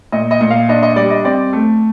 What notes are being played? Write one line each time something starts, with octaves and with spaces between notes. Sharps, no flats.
A#2 D#5
D#5
A#2
F5
D4 D#5
D#5
G3 D5
D#5
C4 D5
A3